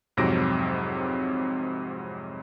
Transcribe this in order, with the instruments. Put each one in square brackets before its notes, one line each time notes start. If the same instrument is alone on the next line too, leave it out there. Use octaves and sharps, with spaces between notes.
[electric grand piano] F2 G#2 C3 F#3 A#6 D7